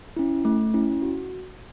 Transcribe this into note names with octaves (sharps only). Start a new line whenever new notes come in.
C#4 E4
A3
C#4 E4
F#4